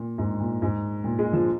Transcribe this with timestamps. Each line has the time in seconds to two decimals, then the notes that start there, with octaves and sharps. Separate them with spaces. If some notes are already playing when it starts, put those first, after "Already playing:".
Already playing: A#2
0.18 G#2
0.40 A#2
0.62 G#2
1.04 A#2
1.19 G#3
1.33 F3